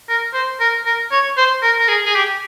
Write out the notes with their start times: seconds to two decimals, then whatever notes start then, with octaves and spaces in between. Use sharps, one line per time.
0.09 A#4
0.34 C5
0.60 A#4
0.86 A#4
1.12 C#5
1.37 C5
1.62 A#4
1.79 A#4
1.88 G#4
2.06 G#4
2.15 G4